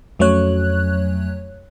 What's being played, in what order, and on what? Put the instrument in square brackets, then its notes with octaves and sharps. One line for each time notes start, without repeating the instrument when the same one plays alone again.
[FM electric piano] F2 F#3 A3 C#4 C#5 F#6